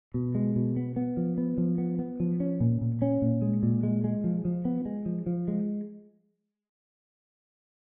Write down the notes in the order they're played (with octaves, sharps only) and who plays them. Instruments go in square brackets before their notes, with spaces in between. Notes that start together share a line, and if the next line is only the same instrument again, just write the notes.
[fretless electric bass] B2
G#3
B2
B3
B3
F3
B3
F3
B3
B3
F3
C#4
A#2
A#2
C#4
A#2
G#3
A#2
G#3
G#3
F3
F3
B3
G#3
F3
F3
G#3